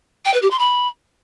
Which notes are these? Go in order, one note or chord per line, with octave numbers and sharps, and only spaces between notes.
G5
B4
G4
C6
B5